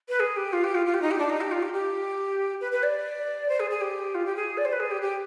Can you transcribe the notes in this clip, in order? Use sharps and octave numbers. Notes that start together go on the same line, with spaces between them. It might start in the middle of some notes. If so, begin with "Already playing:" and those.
B4
G#4
G4
F4
G4
F4
F4
G4
D#4
G4
D4
D#4
G4
F4
G4
G4
B4
B4
D5
C5
G#4
G#4
G4
F4
G4
G#4
D5
C5
B4
G#4
G4
G4